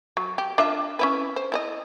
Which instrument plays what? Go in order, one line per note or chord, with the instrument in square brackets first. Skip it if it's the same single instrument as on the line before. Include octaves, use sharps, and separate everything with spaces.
[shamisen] F#3
G4
D4 F4 E5
C#4 E4 B4
C5
E4 C5 D#5